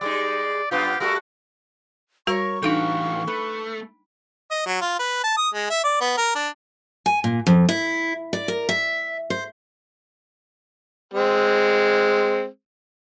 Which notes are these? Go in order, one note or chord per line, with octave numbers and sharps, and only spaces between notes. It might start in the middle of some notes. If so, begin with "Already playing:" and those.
G3 G#3 D#4 D5
F#2 B3 F4 G4
G3 A3 F#4 A#4
G3 F#4 A#4 C5 C#5 C#6
A2 E3 D4 D#4 F#4 A4 F5 G5
A3 B4
D#5
F#3
F4
B4
A5
D#6
G#3
E5
D5
B3
A#4
D4
G#5
A#2
F2
E4
D5
A#4
E5
C5
G#3 C4